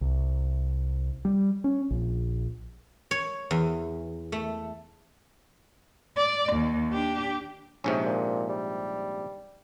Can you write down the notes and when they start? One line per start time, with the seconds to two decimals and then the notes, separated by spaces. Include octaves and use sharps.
0.01 C2
1.25 G3
1.64 C#4
1.91 A#1
3.11 C#5
3.51 E2
4.32 A3
6.16 D5
6.53 D#2
6.93 D4 G4
7.84 A#1 G#2 C3 C#4
8.06 A#2
8.49 G3